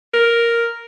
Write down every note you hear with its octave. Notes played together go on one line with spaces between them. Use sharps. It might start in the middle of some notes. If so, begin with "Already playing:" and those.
A#4